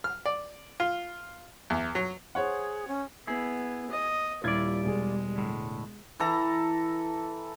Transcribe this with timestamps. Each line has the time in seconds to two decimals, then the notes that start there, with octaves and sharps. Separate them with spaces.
0.04 F6
0.26 D5
0.80 F4
1.70 E2
1.95 F#3
2.35 G#4 C5 C#5 F#5
2.87 C#4
3.27 B3 E4 G#4
3.91 D#5
4.44 D#1 G3 E4 F4 D5 G#6
4.85 E1 G#3 G#4
5.36 A2 D3
6.20 E3 A4 A#5